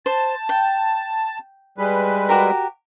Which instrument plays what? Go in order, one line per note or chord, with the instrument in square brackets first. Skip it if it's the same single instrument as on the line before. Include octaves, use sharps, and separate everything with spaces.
[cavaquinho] C5 [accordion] A5
[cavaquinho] G5
[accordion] G3 G#3 B4
[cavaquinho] F#4 G4 A#4